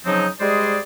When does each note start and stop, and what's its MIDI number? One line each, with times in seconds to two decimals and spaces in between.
0.05 0.27 49
0.05 0.27 53
0.05 0.27 54
0.05 0.27 60
0.05 0.27 63
0.40 0.78 55
0.40 0.78 56
0.40 0.78 68
0.40 0.78 72
0.40 0.78 74
0.40 0.78 75